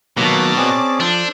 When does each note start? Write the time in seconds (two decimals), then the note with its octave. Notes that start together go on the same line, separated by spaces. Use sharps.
0.17 B2 D#3 F#3 A#3 C#5 A5 D6
0.57 C4 C#4 G#4 D5
1.00 F3 D4 A4 C5